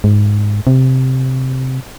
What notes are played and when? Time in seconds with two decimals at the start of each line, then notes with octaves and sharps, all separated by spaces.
0.04 G#2
0.67 C3